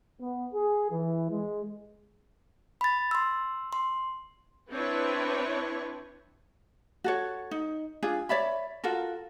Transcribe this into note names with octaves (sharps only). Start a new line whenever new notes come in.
B3
G#4
E3
G#3
B5 A6
C6 E6
C6
C4 D4 E4 B4 C#5
F#4 A4 C#5
D#4
D4 F4 G#4
C#5 D5 E5 B5
F4 F#4 A4 A#4